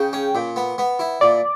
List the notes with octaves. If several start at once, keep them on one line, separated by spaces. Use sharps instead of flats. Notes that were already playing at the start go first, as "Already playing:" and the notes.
Already playing: C#3 G5
C#4
A#2
B3
B3
E4
A#2 D5